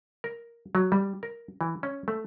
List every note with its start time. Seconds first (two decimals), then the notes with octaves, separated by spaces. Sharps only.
0.24 A#4
0.75 F#3
0.92 G3
1.23 A#4
1.61 E3
1.83 C#4
2.08 A3